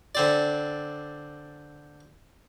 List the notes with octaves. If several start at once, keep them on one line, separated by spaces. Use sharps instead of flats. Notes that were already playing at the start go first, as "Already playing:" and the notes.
D3 C4 D5